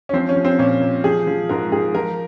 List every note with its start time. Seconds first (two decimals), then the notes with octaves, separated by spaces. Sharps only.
0.09 C#4
0.13 F3 C4
0.29 C#4
0.36 F3
0.45 C4
0.59 A#2 C#4
0.82 A#2
1.04 F3 G#4
1.27 F3
1.49 G#2 A#4
1.72 G#2 G#4
1.95 F3 A#4